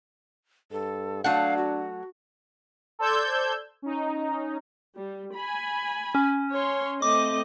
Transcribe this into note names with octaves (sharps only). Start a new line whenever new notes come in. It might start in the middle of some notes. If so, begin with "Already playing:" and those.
G2 A4
F#3 A3 D4 F5 F#5
F#4
A4 C5 D5 E6 G6 G#6
C#4 D#4
G3
G#5 B5
C#4
C#5 C6
A3 C4 D#5 D6